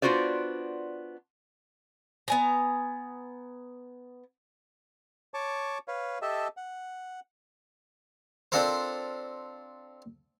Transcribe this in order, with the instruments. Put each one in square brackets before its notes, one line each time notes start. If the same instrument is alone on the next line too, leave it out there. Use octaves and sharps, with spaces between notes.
[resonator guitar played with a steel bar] B3 D4 F4 F#4 C5 D5
[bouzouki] B3 G#5 A#5
[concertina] C#5 A5 C#6 D6
B4 C#5 F5
G4 A4 D#5 E5 A5
F#5
[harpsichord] C4 D4 F4 A4 A#4 C5